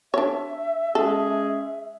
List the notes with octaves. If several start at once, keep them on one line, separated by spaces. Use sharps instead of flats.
D4 C#5 E5
G#3 C#4 G#4 A4